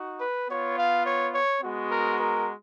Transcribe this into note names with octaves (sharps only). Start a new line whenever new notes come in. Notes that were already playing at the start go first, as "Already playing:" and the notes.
Already playing: D#4 F#4
B4
B3 F4 C#5
F5
C#5
C#5
G#3 B3 F#4
A#4
A#4